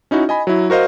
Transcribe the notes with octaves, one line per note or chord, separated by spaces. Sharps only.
C#4 D#4 E4 F#4
D#5 G#5 B5
F#3 E4
F#4 A#4 C5 D#5 F5